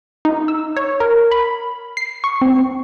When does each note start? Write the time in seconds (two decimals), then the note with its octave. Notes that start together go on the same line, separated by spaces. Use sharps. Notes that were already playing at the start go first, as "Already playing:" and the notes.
0.25 D#4
0.48 E6
0.77 C#5
1.00 A#4
1.31 B5
1.97 C7
2.24 C#6
2.41 C4